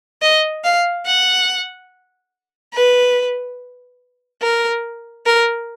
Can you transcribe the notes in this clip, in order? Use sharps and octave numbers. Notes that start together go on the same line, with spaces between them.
D#5
F5
F#5
B4
A#4
A#4